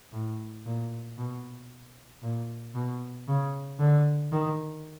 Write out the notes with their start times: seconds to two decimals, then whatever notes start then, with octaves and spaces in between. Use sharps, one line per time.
0.12 A2
0.65 A#2
1.18 B2
2.22 A#2
2.75 B2
3.28 C#3
3.80 D3
4.32 D#3